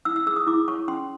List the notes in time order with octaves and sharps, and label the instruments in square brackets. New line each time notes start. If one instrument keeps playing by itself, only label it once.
[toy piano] E4 E6
E6
G#4 E6
D#6
E4 D6
C#5 C#6
C#4 C6